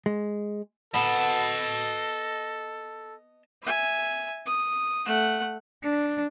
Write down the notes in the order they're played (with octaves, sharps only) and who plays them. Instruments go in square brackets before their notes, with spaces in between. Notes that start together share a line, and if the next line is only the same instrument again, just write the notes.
[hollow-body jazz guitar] G#3
[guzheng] B3 [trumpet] A4 [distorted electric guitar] D#5 A5
[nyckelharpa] E5 G#5
D#6
A3 F#5
[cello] D4